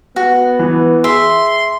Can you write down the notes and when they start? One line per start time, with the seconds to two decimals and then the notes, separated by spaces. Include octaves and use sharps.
0.16 B3 F#4
0.59 E3
1.04 G#4 E5 C6